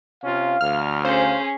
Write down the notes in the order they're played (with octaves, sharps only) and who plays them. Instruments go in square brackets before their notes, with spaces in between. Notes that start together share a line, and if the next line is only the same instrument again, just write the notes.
[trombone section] C3 C#4 F4 [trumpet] F5
[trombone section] D2 [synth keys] F6
[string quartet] C#4 G#4 [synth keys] C5 [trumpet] F5